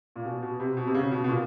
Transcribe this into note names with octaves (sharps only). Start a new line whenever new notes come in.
A#2
B2
B2
C3
B2
C3
C#3
B2
B2
A#2